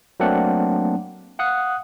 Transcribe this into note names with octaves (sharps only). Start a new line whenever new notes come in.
F#3 A3 A#3 C4 D4 F#5
F5 F#5 D#6 F#6